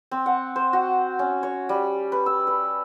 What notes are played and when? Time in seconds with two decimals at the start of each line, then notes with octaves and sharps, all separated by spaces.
0.11 C4
0.26 F#5
0.56 C5
0.73 F#4
1.19 C#4
1.43 C#5
1.69 G3
2.12 B4
2.26 E6
2.47 B4